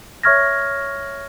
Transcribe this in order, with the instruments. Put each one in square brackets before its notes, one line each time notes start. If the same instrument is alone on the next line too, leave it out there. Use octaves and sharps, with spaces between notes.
[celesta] C#5 E5 C#6 F6 G#6 A#6